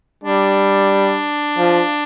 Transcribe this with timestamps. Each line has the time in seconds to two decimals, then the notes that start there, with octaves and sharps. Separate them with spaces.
0.24 G3 D4
1.58 F3